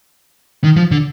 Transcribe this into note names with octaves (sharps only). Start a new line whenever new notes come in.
D#3
F3
D3